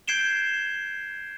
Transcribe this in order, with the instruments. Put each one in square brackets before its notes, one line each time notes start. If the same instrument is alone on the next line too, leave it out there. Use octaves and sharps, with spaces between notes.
[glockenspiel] G6 G#6 C7 D7 E7 G7